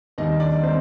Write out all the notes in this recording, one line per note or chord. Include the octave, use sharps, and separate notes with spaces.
D#2 D#3 G3 D#4 D#5
D4 D5
D#3 G3 C4 C5